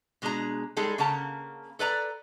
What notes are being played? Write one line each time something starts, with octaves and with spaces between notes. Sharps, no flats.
B2 G#3 D4 G#4 A#5
G3 G#3 D#4 G#4 A4
C#3 A#3 C#4 F#5 A5 A#5
A4 B4 D5 A#5